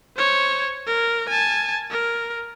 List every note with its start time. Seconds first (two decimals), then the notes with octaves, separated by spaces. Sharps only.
0.17 C5 C#5
0.87 A#4
1.29 G#5 A5
1.90 A#4